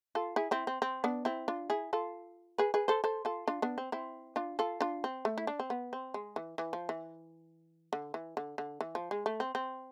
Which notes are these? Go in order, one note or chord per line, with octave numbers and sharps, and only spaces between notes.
F4 A4
E4 G#4
C4 E4
C4
C4
B3 D4
C4 E4
D4 F4
E4 G#4
F4 A4
G#4 B4
G#4 B4
A4 C5
A4 C5
F4 A4
D4 F4
B3 D4
C4
C4 E4
D4 F4
F4 A4
D4 F4
C4
A3
E4
D4
C4
B3
C4
G#3
E3
E3
F3
E3
D3
E3
D3
D3
E3
F3
G#3
A3
C4
C4